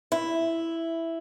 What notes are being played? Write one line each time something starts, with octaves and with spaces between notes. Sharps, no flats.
E4